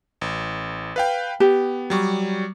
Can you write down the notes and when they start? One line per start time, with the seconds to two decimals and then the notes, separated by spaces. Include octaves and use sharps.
0.21 A1
0.96 B4 F5 G5
1.40 B3 G4
1.90 F#3 G3 C#6